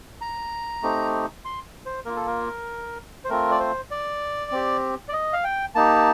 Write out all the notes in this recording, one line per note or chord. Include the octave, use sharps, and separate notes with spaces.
A#5
A3 C4 D#4 G4
C6
C5
A#3 F4 A#4
A4
A#4
C5
A3 C4 F4 A#4
D5
C5
D5
C4 G4
D5
D#5
F5
G5
A#3 D#4 G4 A5